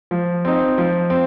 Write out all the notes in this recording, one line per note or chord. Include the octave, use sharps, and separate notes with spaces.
F3
C4 D#4
F3
C4